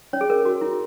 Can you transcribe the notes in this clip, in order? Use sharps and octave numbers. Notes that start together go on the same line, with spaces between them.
C#4 C#5
G#4
A#4
F#4
E4